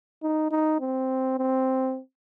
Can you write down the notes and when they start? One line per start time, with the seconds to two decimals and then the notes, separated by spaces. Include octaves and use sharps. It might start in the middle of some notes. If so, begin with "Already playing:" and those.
0.23 D#4
0.51 D#4
0.80 C4
1.38 C4